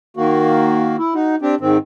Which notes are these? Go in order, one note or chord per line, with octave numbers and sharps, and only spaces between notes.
D#3 A#3 F#4
E4
D#4 F#4
C4 D4 G4
G#2 D#3 C4